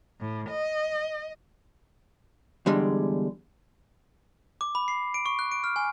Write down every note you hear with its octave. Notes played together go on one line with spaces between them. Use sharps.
A2
D#5
E2 D3 G3 G#3
D6
B5
C7
D7
C#6
F#6
D7
F6
G#5